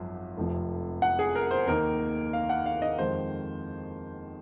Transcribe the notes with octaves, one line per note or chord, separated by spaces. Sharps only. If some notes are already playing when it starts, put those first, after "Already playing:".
Already playing: G#1 F#2 F3
F1 F2 C3 F3
F#5
G#4
A#4
C5
D#2 D#3 A#3 D#4 A#4
F5
F#5
F5
D#5
F2 D#3 G#3 D#4 C5